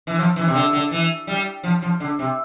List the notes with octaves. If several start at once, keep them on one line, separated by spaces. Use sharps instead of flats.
E3
F3
E3
C3
D3
D3
E3
G3
F3
F3
D3
C3